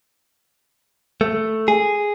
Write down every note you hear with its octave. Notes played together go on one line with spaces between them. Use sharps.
A3
G#4